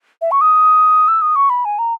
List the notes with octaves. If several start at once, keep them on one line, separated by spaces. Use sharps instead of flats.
E5
C#6
D#6
E6
D#6
C#6
B5
G#5
A#5